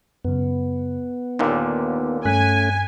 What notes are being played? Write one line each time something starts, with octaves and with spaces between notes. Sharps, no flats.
F#2 C#3 B3
D#2 A#2 D3 D#4 A#4
G2 A3 C#4 G#5 F#6 B6